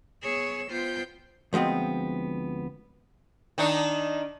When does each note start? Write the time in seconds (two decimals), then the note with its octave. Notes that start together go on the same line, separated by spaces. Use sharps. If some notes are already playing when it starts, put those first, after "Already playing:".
0.24 B3 G#4 C#5 E6
0.70 B3 F4 C5 G5 G6
1.53 D2 F3 G#3 B3 C4
3.58 D#3 D4 D#4